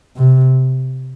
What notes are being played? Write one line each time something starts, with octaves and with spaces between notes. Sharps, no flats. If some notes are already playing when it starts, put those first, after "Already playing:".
C3